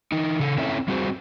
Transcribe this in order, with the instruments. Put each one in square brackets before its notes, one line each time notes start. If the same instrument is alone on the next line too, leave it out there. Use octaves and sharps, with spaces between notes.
[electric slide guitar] E3 D#4
C#3 A4
C4 C#4 E4 A4 C#5 E5
G3 C4 F#4 G#4 C5